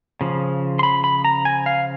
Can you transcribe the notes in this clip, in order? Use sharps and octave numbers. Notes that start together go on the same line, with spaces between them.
C#3 F3
C6
B5
B5
A#5
G#5
F5